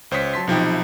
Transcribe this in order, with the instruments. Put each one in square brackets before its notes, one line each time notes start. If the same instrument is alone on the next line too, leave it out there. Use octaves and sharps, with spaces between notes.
[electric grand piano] C#2 C5 C#5 D#6 B6
F#3 A5 C6 B6
B1 C3 F3 D#4 E4 G5